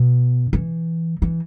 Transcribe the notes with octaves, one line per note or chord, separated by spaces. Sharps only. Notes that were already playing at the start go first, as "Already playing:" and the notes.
Already playing: B2
E3
E3